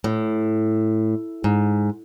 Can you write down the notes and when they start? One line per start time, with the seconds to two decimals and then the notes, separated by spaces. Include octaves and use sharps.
0.04 A2
1.44 G#2